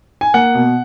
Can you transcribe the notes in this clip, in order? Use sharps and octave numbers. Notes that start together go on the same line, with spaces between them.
G#5
A#3 F#5
B2